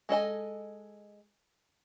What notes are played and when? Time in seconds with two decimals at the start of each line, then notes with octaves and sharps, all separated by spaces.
0.09 G#3 A4 D#5 G#5